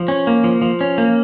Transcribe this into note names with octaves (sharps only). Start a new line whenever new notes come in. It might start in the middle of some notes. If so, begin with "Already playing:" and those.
Already playing: F3
C#4
A#3
F3
F3
C#4
A#3